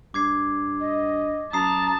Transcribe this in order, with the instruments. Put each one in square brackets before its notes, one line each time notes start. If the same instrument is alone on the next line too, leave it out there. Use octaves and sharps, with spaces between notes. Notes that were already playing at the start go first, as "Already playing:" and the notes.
[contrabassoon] G2 [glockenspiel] D6 G#6 C7
[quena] D#5
[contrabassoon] F#2 [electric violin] A5 [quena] A#5 [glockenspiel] D#6 C7